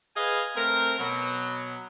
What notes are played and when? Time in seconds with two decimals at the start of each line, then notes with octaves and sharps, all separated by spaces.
0.16 G#4 B4 D#5 F5 G#5
0.55 A3 C4 A#4
0.99 B2 F#3